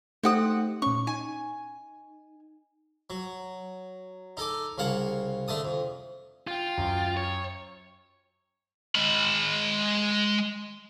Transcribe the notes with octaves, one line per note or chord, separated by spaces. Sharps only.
A3 C4 D#4 G4 F#5 D#6
A#2 C#4 C#6
D#4 G#5
F#3
D#4 A4 G#5 D6
C2 C#3 F5 F#5 A5
D3 A3 A5 D#6
F2
F4 G5
F#2
C#5
G#3 B5